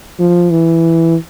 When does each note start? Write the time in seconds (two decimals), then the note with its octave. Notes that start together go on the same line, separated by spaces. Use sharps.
0.20 F3
0.51 E3